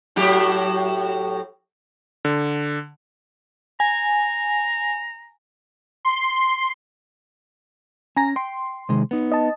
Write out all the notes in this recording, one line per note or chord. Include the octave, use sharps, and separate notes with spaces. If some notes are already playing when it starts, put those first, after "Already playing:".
A2 F#3 G4
D3
G#5 A#5
C6
C#4 G#5 A#5 A#6
G5 C6
C3 D#3 G#3
B3 D#4
D#5 A5